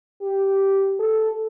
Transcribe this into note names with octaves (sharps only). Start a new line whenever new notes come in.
G4
A4